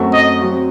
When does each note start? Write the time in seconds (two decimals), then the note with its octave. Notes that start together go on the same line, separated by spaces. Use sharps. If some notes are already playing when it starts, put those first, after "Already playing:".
Already playing: F#2 F#3 A3 C4 F#4
0.13 D#5
0.41 F#3 C4 F#4